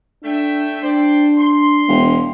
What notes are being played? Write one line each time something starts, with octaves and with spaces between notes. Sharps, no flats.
A3 D4 E5 G5
D4 C5 D5 G5
C6
E1